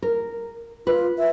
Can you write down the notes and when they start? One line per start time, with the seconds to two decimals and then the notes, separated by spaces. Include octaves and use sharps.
0.02 A#4
0.87 F4 B4
1.18 E5